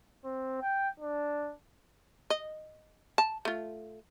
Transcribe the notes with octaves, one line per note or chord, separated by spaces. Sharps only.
C4
G5
D4
D#5
A5
A3 F4